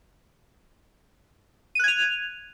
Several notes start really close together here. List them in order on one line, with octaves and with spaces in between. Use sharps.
D#7 F#6 G#6 F7